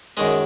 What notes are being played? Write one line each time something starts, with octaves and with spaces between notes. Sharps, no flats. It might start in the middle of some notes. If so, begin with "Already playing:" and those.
F#2 D#3 G#3 D#5